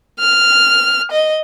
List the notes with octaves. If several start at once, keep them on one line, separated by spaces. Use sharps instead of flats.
F6
D#5